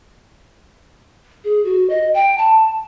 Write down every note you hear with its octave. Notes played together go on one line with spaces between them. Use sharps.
G#4
F#4
D#5
G5
A5